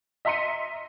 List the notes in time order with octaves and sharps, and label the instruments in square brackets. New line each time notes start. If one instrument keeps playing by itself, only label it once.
[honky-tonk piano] D#5 E5 A#5 C6 C#7 D#7